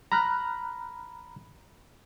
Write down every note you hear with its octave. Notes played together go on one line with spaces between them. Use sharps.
A#5 B5 F6 F#6